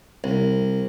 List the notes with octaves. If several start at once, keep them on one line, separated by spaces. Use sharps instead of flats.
C2